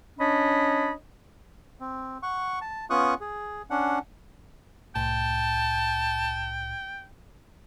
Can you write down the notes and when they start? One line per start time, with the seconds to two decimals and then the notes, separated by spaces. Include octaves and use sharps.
0.19 C#4 D4 C#5 D#5 B5
1.79 C4
2.23 F#5 C#6
2.61 A5
2.90 B3 C#4 F4 C#6 D#6 F#6
3.20 G#4
3.70 C#4 D4 F#5
4.96 C2 A2 G5 A5